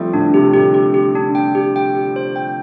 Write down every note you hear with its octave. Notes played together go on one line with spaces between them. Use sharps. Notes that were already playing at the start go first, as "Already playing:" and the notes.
Already playing: F3 G3 A3 C4
A2 D3 D4
C3 G4
A2 D3 G4
G4
G4
D4
G5
G4
G5
G4
C5
G5